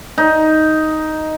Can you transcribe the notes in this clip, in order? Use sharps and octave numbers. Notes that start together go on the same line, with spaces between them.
D#4